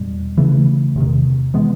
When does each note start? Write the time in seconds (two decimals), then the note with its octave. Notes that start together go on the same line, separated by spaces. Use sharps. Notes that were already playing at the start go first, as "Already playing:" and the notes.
Already playing: E2 B2 G3
0.37 C#3 E3 A3
0.96 E2 C3 D#3
1.54 E3 G#3 B3